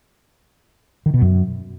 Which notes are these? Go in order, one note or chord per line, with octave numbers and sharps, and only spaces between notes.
D#3
B2
F#2